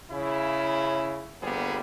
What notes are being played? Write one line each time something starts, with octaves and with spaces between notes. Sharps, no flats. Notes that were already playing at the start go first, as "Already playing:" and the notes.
C#3 E4
G1 G3 A#3 B3 G#4